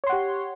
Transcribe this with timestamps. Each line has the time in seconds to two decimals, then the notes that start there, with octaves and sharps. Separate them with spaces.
0.04 C#5
0.07 C6
0.10 F#5
0.12 G4